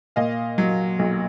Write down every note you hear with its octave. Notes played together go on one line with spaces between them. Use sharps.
A#2 D#5 F5
F#3
B1